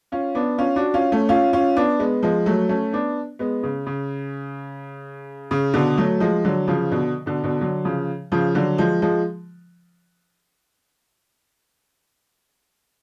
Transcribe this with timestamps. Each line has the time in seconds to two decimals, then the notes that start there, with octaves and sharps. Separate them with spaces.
0.12 C#4 F4
0.35 B3 D4
0.58 C#4 F4
0.76 D4 F#4
0.94 C#4 F4
1.12 A3 C#4
1.29 C#4 F4
1.53 C#4 F4
1.76 B3 D4
1.99 G#3 B3
2.23 F3 G#3
2.46 F#3 A3
2.69 A3 C#4
2.93 B3 D4
3.39 G#3 B3
3.63 C#3
3.87 C#3
5.51 C#3
5.74 B2 D3
5.98 F#3 A3
6.20 F3 G#3
6.45 D3 F#3
6.68 C#3 F3
6.92 B2 D3
7.26 B2 D3
7.44 B2 D3
7.61 D3 F#3
7.84 C#3 F3
8.32 C#3 F3
8.55 D3 F#3
8.78 F3 G#3
9.02 F3 G#3